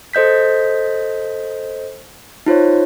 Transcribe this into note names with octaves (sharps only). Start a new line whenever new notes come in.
A4 C5 D#5 G6 B6
D#4 F4 C5 C#5